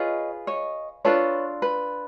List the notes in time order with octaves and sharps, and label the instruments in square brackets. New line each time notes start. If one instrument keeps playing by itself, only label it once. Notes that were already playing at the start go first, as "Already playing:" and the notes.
Already playing: [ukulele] F4 G#4 B4 C#5 D#5
C#5 D#5
D4 F4 A4 B4 C#5
B4